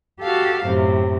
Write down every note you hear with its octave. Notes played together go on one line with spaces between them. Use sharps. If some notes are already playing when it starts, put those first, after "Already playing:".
F#4 G4 A4 F5
F#2 A2 C3